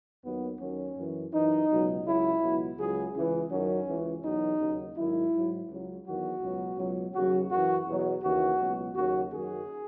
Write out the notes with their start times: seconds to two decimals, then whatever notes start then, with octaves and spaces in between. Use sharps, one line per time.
0.25 D#2 D#3 F#3 B3
0.60 D#2 D#3 F#3 C#4
0.96 F#2 E3
1.33 F#2 E3 D#4
1.70 C#2 B2 F#3
2.06 C#2 C#3 F#3 E4
2.42 C#2 B2 F#3
2.78 C#2 C#3 F#3 G#4
3.15 C#2 C#3 E3
3.51 F#2 D#3 F#3 C#4
3.88 C#2 C#3 E3
4.24 E2 B2 F#3 D#4
4.60 D#2 C#3 F#3
4.97 G#2 D#3 F#3 E4
5.33 G#2 F#3
5.69 C#2 C#3 F#3
6.05 E2 D#3 F#3 F#4
6.41 C#2 B2 F#3
6.78 C#2 B2 F#3
7.14 D#2 C#3 F#3 F#4
7.50 F#2 E3 F#4
7.87 E2 B2 F#3
8.23 D#2 C#3 E3 F#4
8.60 C#2 B2 F#3
8.96 D#2 C#3 F#3 F#4
9.33 F#2 D#3 F#3 G#4